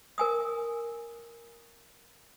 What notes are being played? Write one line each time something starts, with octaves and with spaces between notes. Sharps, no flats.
A#4 G#5 D#6